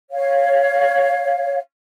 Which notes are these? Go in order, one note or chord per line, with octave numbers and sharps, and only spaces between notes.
C#5 F5